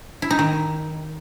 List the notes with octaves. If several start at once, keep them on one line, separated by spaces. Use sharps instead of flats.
E4
D#4
D#3